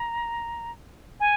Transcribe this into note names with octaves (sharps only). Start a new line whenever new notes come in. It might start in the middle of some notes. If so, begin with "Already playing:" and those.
Already playing: A#5
G#5